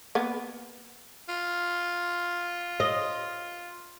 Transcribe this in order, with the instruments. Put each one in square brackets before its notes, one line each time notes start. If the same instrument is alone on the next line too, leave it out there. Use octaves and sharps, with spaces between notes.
[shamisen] A#3 B3
[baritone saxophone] F4
[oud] D#5